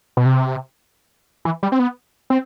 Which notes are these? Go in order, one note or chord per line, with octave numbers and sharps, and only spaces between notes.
B2
C3
E3
G3
C4
B3
C4